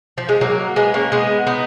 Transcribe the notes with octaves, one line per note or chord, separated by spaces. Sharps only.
F3
G#3
F#3 A#3
G#3 B3
A#3 C#4
G#3 B3
B3 D#4